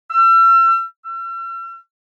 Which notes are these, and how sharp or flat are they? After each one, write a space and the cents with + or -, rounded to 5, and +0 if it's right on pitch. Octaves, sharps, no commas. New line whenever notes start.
E6 +40
E6 +45